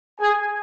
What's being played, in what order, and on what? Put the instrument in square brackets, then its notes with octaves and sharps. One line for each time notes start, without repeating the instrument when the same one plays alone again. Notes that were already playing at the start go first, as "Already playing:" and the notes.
[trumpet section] G#4 G#5